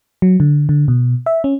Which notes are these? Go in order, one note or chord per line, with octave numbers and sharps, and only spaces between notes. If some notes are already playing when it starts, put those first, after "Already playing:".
F#3
D3
D3
B2
E5
C#4